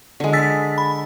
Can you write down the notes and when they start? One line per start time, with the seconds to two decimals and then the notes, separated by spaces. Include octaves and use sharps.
0.20 D3 G#3
0.33 E6 A6 B6
0.78 B5